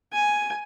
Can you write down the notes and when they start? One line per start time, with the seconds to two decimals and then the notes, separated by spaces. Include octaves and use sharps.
0.12 G#5